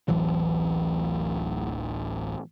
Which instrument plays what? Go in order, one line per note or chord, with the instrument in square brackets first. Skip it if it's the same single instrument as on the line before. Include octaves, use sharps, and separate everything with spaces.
[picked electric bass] D1 A1 E3 F#3